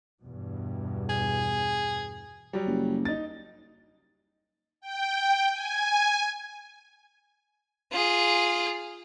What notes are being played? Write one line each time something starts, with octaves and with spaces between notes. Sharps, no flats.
E2 G2 B2
G#4
F#3 G3
F#1
D#4 A6
G5
G#5
F4 G#4